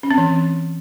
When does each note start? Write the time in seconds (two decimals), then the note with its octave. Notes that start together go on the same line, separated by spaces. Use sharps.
0.03 C#4
0.11 C4
0.18 E3